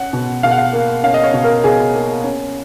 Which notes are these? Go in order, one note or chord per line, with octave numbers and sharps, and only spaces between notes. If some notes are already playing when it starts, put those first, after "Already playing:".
Already playing: C#4 F#5
B2
B2 F5
F#5
F5
A#3
C#4 F5
D#5
C#5
B2
A#4
B2 G#4
A#3
C#4